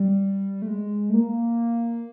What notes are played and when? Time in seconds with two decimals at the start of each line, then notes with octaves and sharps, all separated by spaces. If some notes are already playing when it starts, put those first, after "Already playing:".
Already playing: G3
0.62 A3
0.68 G#3
1.10 A3
1.14 A#3